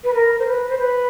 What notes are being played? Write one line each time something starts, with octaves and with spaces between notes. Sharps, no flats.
B4
A#4
C5
B4
C5
B4